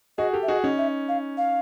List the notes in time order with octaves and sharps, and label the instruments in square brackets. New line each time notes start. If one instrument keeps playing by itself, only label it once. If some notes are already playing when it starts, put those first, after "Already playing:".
[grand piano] F#4 G#4 [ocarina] D#5
[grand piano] G4 A4
[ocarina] E5
[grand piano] F#4 G#4 [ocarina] D#5
[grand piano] C#4 D#4
[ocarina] E5
F5
F5